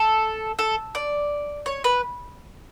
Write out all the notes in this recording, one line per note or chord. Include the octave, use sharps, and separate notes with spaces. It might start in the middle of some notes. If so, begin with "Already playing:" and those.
Already playing: A4
A4
D5
C#5
B4